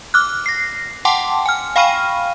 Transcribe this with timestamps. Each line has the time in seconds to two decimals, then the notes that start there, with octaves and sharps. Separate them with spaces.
0.14 D6 F6 F#6
0.46 A#6 C7
1.05 F#5 G5 A5 C6 D6
1.46 G#5 F6
1.76 F5 G5 B5 C#6 F6 D#7